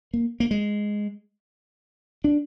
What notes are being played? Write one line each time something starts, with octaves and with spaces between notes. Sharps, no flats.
A#3
A#3
G#3
D4